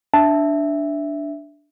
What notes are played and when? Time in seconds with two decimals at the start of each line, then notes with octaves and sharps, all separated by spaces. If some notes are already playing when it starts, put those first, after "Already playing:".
0.14 D4 E5 A5